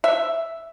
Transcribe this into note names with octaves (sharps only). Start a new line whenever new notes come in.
E5